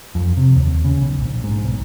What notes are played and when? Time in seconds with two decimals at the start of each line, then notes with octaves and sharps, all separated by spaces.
0.15 F2
0.37 C3
0.56 D#2
0.84 C#3
1.01 B1
1.21 A#1
1.44 G#2
1.64 B1